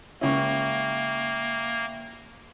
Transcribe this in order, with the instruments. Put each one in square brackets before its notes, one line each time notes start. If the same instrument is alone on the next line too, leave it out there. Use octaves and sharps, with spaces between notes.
[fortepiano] C#2 C#4 [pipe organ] A#3 [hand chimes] E5 G5 C#6